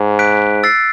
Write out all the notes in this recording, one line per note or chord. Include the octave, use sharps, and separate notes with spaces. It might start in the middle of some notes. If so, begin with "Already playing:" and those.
Already playing: G#2
F#6 B6 D7
E6 A6 C7